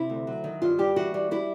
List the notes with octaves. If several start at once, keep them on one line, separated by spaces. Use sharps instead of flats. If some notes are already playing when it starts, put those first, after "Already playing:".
Already playing: C3 E4
D2
F#3
D#3
G2 F4
G3 G4
E3 F#4
G3
G3 E4